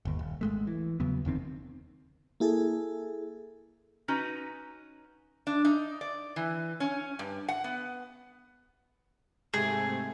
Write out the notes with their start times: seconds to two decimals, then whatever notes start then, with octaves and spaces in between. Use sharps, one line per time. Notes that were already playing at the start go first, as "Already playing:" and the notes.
0.05 G1 D#2
0.19 D#1
0.41 G#1 G#3 A3
0.67 E3
1.00 E2 C#3 F#3 B3
1.25 F1 E2 D#3 C4
2.40 A#3 E4 G#4 A4
4.08 C#4 D#4 F#4 B4
5.47 D4
5.65 D#4
6.01 D5
6.36 E3
6.80 C#4
7.19 G2
7.48 F#5
7.64 B3
9.54 G#2 C3 A3 G#4